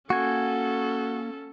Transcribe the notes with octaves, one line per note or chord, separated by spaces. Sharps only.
A#3 C#4 F#4 A4 G#5